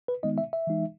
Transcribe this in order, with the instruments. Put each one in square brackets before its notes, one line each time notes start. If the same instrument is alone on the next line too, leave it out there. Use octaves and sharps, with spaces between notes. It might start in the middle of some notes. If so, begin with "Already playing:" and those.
[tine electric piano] B4
D#3 G#3 B3 D#4 D#5
E5
E5
E3 G#3 D#4